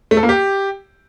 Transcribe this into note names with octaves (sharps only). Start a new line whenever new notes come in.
A3
A4
A#3
G4